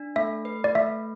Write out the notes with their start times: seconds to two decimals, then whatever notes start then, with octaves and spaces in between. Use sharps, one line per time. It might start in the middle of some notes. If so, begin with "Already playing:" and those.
Already playing: D4
0.16 A3 E5
0.45 B4
0.64 D5
0.75 A3 E5